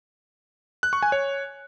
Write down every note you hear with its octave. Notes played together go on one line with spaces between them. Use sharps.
F#6
C#6
G#5
C#5